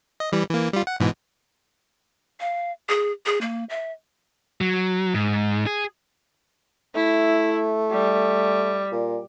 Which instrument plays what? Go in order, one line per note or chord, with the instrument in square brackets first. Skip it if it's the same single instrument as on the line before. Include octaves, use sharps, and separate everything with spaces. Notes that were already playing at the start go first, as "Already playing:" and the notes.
[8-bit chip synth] D#5
E3 G3
E3 A#3
G3 F4
F#5
G#2 B2 E3
[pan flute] F5
G#4
G#4
A#3
E5
[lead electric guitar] F#3
G#2
G#4
[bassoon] A3 [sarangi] E4
[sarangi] G3
[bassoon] A#2